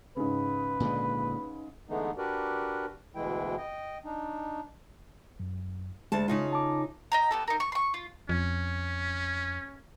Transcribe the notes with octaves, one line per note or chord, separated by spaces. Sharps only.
G#2 C#3 B4
A#2 D3 G#3
D3 E3 G#3 A3 B3 D#4
D4 F#4 G4 A#4 B4 D5
D2 B2 E3 G#3 E4 G5
D#5 G5
D4 D#4
F#2
D2 G#3 A5
C#3 D#4 F4
A5 D6
D#5 G5 A#5
B3 G4 A4
D#4 A#4
C#6
C6 C#6
F4
F2 C#4